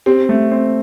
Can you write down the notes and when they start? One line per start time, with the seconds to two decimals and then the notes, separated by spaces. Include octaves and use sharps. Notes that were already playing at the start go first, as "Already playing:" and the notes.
0.06 C4 G4
0.29 A3
0.51 C4